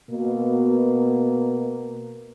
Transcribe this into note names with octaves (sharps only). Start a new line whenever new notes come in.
B2 A#3